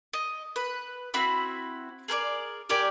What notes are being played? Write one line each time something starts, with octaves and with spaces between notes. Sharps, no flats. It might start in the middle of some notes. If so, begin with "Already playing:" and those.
D#5
B4
C4 E4 F#4 B5
G#4 A#4 B4 D5
G4 A#4 D5 G#5